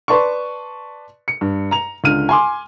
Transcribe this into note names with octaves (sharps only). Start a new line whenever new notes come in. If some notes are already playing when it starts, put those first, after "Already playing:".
B4 D5 A5 C6 C#6
C#7
G2
A#5 F7
C#2 D3 F6 D#7
G#5 C6 D6